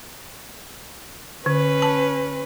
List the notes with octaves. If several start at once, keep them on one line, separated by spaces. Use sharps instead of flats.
D3 C#4 B4
A5